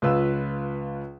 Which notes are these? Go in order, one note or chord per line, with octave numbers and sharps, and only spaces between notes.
C#2 F4 B4 E6